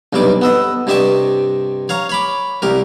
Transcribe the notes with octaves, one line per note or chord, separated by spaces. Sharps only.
B1 G2 C3 G3 D6
B3 A4 D#5
G2 C3 G4 D#5 A5 C#6
C#5 F5 A#5
C#5 B5 D6
C2 G4 A#4